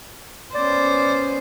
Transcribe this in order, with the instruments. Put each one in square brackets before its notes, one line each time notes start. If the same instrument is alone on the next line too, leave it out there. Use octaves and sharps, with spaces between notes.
[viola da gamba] B3 C#4 C5 [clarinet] D5